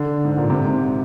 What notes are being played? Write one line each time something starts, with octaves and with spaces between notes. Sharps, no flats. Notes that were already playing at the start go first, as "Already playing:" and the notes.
Already playing: D3
G#2
A#2
C3
G#2